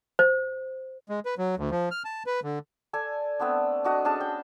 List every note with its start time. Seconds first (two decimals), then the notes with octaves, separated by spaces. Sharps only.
0.19 C5
1.09 G#3
1.25 B4
1.38 F#3
1.57 D2
1.71 F3
1.91 F6
2.05 A5
2.26 B4
2.43 D3
2.93 A4 D5 G#5
3.39 A3 B3 C4 D4
3.84 D4 F#4 D#5
4.05 C#4 D4 G#4 A5
4.21 G5